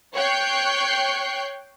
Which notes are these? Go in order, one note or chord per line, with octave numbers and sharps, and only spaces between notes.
C#5 G5 C#6 F#6 G6 C7